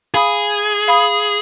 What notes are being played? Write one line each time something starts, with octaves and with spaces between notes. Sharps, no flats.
G#4 F5 B5 D#6
F5 B5 D#6